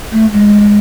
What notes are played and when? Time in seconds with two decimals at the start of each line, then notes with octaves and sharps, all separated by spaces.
0.12 A3
0.33 G#3